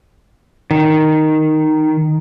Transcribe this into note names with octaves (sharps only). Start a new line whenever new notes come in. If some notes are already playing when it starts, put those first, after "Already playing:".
D#3